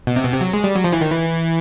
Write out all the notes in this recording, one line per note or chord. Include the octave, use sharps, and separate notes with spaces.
B2
C3
B2
C3
F#3
G#3
G3
F#3
F3
E3
D#3
E3